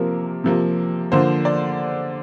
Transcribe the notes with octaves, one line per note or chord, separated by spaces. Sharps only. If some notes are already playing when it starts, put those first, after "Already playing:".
Already playing: C3 F3 A#3 A#4
C3 F3 A#3
D3 F3 A#3 C5
D5